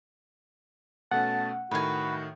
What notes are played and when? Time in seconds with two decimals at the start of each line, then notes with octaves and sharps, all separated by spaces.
1.11 B2 A3 C#4 F#5 A5
1.71 A2 D#3 F#4 B4 G#5